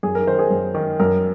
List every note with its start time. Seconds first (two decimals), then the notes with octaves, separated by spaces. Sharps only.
0.03 F#2 G#4
0.15 A#4
0.27 D#3 C5
0.39 G#4
0.50 F#2
0.74 D#3
1.00 F#2 A#4